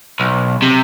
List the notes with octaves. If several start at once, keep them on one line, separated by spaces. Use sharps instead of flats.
B1
C3